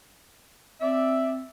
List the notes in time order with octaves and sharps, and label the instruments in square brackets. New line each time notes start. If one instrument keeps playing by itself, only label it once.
[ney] C4 [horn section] D5 E5